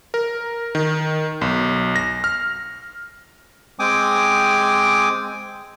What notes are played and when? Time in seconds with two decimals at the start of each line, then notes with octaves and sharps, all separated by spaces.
0.14 A#4
0.75 D#3
1.41 B1
1.96 A#6
2.24 F6
3.79 G#3 C4 G5 G#5 D6 D#6